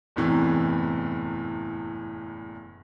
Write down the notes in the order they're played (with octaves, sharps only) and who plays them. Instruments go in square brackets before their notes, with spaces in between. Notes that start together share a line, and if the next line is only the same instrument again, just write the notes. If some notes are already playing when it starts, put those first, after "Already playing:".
[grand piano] F#1 E2 A2 C3 E3